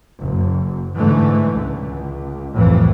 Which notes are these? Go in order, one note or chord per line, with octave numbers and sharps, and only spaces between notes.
F#1
G#2 D3 E3 A3
C#2
C2 F2 A2 E3